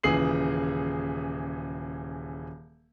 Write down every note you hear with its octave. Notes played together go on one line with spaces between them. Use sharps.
D#1 C#3 E3 G#4 C7 F#7